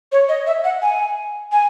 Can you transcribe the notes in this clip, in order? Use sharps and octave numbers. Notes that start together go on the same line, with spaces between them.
C#5
D#5
E5
F#5
G#5
G#5